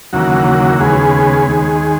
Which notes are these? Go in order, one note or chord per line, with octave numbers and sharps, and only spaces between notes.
D#2 C#3 E3 F#3 A#3 F#4
D#2 C#3 G#3 B3 G#4
D#2 D#3 G#3